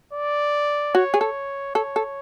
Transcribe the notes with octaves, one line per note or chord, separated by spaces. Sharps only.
D5
F#4 C#5
G#4
A4
A4 C#5
A4